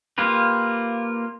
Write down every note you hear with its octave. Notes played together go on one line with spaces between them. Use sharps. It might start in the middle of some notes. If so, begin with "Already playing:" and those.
A#3 F4 G4 B4